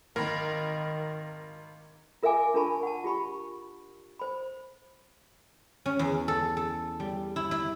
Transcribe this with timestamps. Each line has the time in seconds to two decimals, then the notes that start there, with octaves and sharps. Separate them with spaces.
0.16 G#1 D#3 A#4 B5
2.23 F4 A#4 E5 F5 G#5 D6
2.54 D4 F4 A#4 A5 B5 C#6
2.83 F#5 A5
3.04 F4 G4 B5 C#6
4.19 C5 B5
5.86 C#4
5.99 E2
6.28 A4
6.57 A4
7.00 G3
7.36 E4
7.51 E4